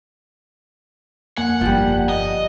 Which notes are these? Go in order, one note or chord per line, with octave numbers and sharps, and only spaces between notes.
F2 A#3 F#5 G#5
G1 F3 G3
D#5